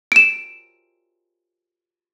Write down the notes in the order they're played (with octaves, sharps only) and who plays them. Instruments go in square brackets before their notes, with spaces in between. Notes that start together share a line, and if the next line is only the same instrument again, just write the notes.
[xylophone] D7 E7